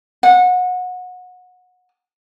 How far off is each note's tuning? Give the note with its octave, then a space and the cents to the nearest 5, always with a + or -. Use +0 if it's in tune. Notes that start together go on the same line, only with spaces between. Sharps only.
F#5 -25